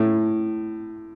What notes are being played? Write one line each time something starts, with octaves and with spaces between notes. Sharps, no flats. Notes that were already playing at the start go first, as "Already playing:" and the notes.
Already playing: A2